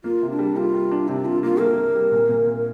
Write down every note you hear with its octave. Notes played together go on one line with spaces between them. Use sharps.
A#3 F4
C3
D4
G3
G3 F4
G3
D4
C3 D4
C3 F4
A#3 F4
A#3 A#4
A#3
G3
A#2
A#2
A#2